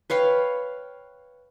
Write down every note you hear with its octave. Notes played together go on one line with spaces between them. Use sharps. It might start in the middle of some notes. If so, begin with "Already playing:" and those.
B4 C#5 F5 G5